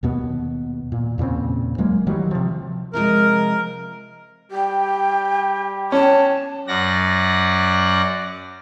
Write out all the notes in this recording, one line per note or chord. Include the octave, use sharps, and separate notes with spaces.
D#2 B2 B3
A#2
E2 A#2 C#3 C4
D1 F#3 G#3 A#3
D#3 E3 F#3 G3
C3 F3
C3 F3 G#3 A#4
G3 G4 G5
C#4 A5
F#2 D5 F#5 A#6